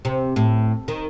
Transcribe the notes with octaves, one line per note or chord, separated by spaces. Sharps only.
C3
A2
D#3